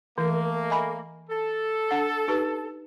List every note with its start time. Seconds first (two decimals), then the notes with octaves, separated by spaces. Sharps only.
0.18 E3 A3 A#3
0.70 D#5 G#5 B5
1.30 A4
1.91 D4 F#5
2.28 D#4 G4 B4